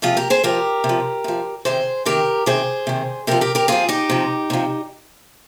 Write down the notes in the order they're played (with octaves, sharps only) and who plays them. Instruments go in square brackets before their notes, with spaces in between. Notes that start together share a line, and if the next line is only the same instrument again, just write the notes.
[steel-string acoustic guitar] C3 F3 F4 G#4
G4 A#4
G#4 C5
C3 F3 G4 A#4
C3
F3
C3 F3
C3 D#3 G#4 C5
C3 D#3 G4 A#4
C3 D#3 G#4 C5
C3 D#3
C3 F3 G4 A#4
G4 A#4
G4 A#4
C3 F3 F4 G#4
D#4 G4
C3 F3
C3 F3